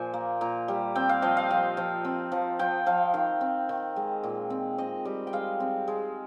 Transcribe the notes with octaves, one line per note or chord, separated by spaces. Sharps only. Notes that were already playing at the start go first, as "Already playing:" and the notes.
Already playing: A#2 F3 C5 G#5
A#3
A#2 A#5
G3
C4 G5
F5
F3 D#5
F5
F3
F3
C4
F3
F3 G5
F3 F5
D#3 F5
C4
D#3
G#3
A#2
C4
C4 D#5
G3
G5
G#3 F5
C4
G#3